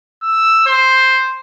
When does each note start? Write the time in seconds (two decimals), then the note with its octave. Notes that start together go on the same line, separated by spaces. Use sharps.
0.23 E6
0.66 C5